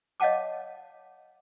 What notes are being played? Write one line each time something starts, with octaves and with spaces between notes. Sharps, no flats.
C#5 D#5 F5 F#5 A5 D6